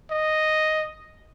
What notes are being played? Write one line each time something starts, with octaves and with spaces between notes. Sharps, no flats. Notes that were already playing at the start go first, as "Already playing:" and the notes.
D#5